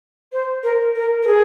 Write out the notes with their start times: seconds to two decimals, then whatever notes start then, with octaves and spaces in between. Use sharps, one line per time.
0.32 C5
0.63 A#4
0.95 A#4
1.22 A#4
1.27 G#4